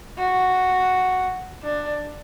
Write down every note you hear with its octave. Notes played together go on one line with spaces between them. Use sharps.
F#4
D4